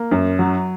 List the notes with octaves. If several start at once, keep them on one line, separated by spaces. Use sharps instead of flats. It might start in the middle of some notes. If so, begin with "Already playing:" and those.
Already playing: A#3
F#2
F#3